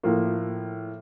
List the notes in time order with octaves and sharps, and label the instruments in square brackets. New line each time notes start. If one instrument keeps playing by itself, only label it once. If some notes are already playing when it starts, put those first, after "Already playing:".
[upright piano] A2 F3 A#3 F4